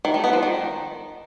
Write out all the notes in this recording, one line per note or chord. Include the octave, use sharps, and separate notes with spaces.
D#3
A3
B3
F3
D#3